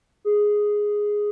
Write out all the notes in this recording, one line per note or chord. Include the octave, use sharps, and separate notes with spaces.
G#4